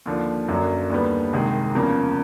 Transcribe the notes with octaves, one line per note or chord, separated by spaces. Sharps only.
D#2 D3 F3
F#2 D3 F#3 A#3 D4
D#2 D3 G3 B3
C2 C3 D#3 G#3
E2 C#3 F3 A#3